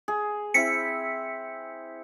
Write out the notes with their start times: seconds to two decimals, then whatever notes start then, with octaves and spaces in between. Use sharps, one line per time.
0.08 G#4
0.54 C4 E4 B6 C#7